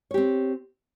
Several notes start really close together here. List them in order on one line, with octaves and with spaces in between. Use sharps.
C#5 G4 C4